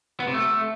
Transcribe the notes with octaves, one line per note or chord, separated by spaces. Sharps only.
B3
C3
A3